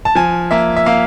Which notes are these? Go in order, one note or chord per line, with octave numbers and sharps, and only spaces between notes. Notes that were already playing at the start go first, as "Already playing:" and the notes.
A5
F3 G#5
A#3 E5
E5
A#3 F5